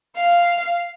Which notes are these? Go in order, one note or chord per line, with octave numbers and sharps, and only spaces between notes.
F5